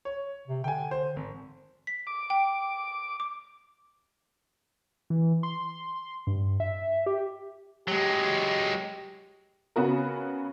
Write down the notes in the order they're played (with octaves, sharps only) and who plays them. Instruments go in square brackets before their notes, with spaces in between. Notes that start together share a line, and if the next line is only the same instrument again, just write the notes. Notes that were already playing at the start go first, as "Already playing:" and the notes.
[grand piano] C#5
[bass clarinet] C3
[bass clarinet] D3 [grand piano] G5 G#5
[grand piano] C5
G#1
[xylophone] B6
[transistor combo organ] D6
[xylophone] G5
D6
[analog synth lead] E3
C6
G2
E5
G4
[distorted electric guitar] F#3 G#3 [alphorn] G4
[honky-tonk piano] C#3 B3 F#4 A#4